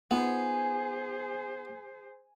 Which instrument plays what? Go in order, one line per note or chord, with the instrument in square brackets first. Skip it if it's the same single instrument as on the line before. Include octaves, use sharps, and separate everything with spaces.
[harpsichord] B3 [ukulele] D#4 F4 F#5 [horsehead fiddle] G#4 C5 [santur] G#5